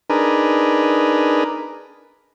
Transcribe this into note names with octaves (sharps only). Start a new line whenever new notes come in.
D4 D#4 G#4 A#4 B4